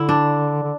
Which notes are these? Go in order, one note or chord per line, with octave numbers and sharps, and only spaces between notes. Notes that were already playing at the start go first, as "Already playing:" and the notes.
Already playing: D3 E4
D4
D3